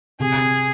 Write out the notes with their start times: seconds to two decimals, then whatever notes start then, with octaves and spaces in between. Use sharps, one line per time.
0.19 C3 G#4